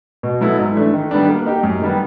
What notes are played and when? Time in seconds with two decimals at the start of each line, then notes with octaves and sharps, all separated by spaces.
0.23 B2
0.41 F#3 B3 E4 A4
0.59 G#2
0.76 E3 A3 D4
0.94 D#3
1.11 G3 B3 D4
1.29 A#3
1.46 D#4 G4
1.63 F#2
1.82 D#3 G3 B3